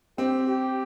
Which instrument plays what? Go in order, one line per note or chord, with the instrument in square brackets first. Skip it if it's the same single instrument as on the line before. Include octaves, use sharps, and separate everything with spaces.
[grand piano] C4 [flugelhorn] G4
[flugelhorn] G4